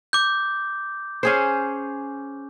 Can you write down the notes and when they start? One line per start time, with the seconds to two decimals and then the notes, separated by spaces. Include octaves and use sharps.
0.13 D6 G6
1.23 C#4 G#4 C5